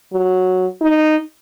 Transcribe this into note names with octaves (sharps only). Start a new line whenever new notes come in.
F#3
D#4